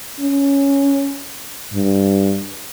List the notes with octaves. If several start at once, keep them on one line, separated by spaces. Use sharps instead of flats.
C#4
G2